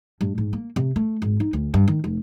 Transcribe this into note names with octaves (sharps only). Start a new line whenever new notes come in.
G2
G#2
A#3
C3
A3
G#1
D#4
D2
G2
D#3
F1